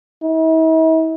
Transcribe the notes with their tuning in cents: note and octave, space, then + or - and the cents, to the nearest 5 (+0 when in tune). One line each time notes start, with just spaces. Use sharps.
E4 -45